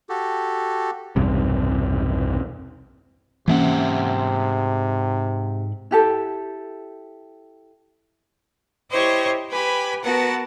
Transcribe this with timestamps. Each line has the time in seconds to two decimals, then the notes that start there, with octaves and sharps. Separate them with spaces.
0.09 F#4 G4 A4
1.16 B1 E2 G2 C3
3.48 G#2 C3 E3 A#3 C#4 E5 F#5
5.91 E4 G4 A4
8.91 E4 G4 C5 C#5 D#5 C#6
9.49 G4 B4 G#5 B5
10.02 B3 F#4 A#4 B4 F#5 A5